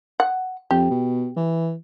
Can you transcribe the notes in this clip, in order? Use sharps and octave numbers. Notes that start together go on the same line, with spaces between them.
F#5
F2 G4
B2
E3